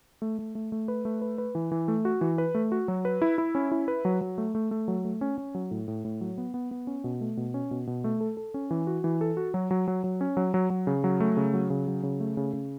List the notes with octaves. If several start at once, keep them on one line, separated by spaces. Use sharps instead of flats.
A3
A3
A3
A3
B4
A3
B4
B4
E3
E3
A3
F#4
E3
B4
A3
F#4
F#3
B4
E4
E4
C#4
E4
B4
F#3
F#3
A3
A3
A3
F#3
A3
C#4
C#4
F#3
A2
A2
A2
F#3
B3
B3
B3
C#4
B2
A3
B2
C#4
B2
B2
A3
A4
A4
C#4
E3
F#4
E3
A4
F#4
F#3
F#3
F#3
F#3
C#4
F#3
F#3
F#3
C#3
F#3
A3
C#3
F#3
C#3
F#3
C#3
A3
C#3
C#3